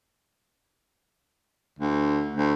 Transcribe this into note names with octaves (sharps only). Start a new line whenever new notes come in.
D2
D2